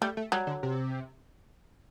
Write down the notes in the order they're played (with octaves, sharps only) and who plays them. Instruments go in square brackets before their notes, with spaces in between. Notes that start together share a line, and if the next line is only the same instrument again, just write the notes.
[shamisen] G3 [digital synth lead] A3
[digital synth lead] A3
[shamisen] F#3 [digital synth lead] G3
[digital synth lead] D3
C3